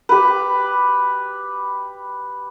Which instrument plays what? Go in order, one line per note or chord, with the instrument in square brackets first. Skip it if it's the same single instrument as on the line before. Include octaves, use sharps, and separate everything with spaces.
[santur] G4 B4